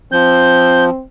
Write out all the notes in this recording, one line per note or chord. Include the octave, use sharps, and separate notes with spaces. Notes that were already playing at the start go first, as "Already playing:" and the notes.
F3 C4 G6